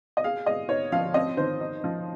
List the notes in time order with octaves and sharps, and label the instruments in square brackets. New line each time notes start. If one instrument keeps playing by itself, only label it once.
[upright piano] D#5
[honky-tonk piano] G#4 [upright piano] F5
[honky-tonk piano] G#3 [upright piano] D#5
[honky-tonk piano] D#4 [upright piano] C#5
[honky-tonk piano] F3 [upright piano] F5
[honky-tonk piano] C4 [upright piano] D#5
[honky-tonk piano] D#3 [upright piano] C5
[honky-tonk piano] D#4
F3